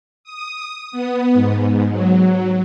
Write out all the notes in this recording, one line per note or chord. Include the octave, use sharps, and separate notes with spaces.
D#6
B3
G#2
F#3